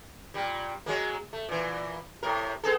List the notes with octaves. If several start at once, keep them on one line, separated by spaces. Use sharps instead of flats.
A#2 G3
F#3 G#3 A#3
A3
A#2 E3
A2 C3 A#4
B3 G#4 A4